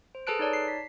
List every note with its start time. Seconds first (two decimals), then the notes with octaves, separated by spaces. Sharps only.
0.15 C5
0.27 G#4 A4 B4 A5 F#6 D7
0.39 D#4 C#5 D5 A5
0.53 C7
0.68 B6